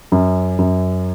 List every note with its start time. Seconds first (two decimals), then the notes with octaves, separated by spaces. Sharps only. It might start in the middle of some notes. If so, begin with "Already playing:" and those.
0.12 F#2
0.59 F#2